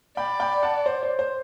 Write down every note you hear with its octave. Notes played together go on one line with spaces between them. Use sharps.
D5 G5 B5
G5 B5
F#5 A5
C5
C5
C5